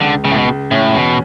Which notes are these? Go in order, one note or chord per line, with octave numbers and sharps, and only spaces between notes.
C#2 D3
C#2 C#3
A2
B2
C#2
A2 C#4
E2 B2